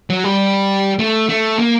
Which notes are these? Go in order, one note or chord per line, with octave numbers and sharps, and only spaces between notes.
F#3
G3
A3
A3
A#3